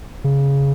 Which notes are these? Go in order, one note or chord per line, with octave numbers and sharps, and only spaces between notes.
C#3